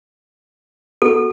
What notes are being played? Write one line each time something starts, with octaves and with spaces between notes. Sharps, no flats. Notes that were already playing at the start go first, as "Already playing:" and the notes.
F#4 A4